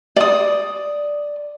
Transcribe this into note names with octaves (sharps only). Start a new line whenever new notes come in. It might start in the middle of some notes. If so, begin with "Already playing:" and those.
D5 D#6